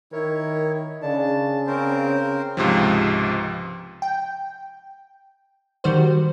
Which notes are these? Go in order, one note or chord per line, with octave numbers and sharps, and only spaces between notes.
D#3 E4 A#4 C#5
C#3 D4 A5
C4 C#4 A#4 C5
C#2 G#2 C3 F3
G5
D#3 G3 F#4 C5